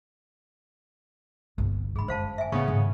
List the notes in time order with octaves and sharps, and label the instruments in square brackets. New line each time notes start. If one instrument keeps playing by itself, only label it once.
[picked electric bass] G1 [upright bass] C2 B3
[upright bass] G#2 D3 [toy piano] G#4 B5
[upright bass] F#2 [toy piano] C5 F5 A5
[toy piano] E5 G#5
[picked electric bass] A2 [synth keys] C#3 B3 [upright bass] C#4 [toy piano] C#6
[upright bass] G#2 D#3